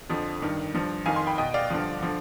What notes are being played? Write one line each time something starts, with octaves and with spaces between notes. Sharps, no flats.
F2 D3 F3
G2 D#3
G2 F3
F2 D#3 F5 G#5
G#5 C6
G5 B5
B2 D#5 G5
D5 F5
G2 D3 F3
D3 F3